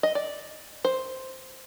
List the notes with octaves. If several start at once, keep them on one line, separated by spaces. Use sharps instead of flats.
D#5
D5
C5